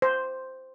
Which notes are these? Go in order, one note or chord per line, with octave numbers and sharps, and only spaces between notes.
C5